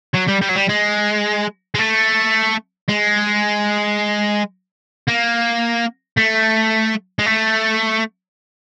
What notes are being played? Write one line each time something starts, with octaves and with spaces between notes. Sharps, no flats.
F#3
G3
G3
F#3
G3
G#3
G#3
A3
G#3
A#3
A3
G#3
A3